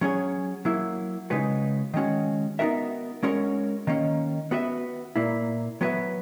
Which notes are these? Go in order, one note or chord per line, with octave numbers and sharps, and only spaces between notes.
F#3 C#4 G#4 C#5
F#3 A#3 E4
C#3 G#3 D#4 F#4 B4
D#3 G#3 C#4 F#4
B3 D#4 F#4 A#4 E5
G#3 C#4 F#4 A#4 C#5
D#3 A#3 C#4
B3 F#4 B4 E5
A#2 A#3 E4
F#3 B3 F#4 B4 E5